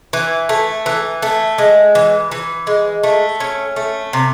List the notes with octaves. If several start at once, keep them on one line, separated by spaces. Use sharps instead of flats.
E3
A3
E3
A3
G#3
E3
E3
G#3
A3
C#4
A3
C3